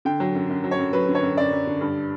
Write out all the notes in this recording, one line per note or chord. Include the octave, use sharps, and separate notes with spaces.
D3 G5
F#3
F#2
F#2
F#3
C#5
F#2
F#3 B4
D3
C#5
F#2
F#2 D5
F#2
D3
G2